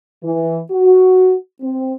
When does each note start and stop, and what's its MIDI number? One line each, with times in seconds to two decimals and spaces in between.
0.24 0.61 52
0.71 1.35 66
1.62 1.94 60